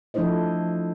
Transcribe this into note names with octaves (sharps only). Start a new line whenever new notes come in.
F3 A3 D4 E4 C5 D#5